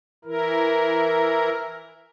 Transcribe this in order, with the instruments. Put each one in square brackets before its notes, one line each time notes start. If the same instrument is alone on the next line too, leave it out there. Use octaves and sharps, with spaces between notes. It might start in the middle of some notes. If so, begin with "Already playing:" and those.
[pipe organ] E3 E4 A#4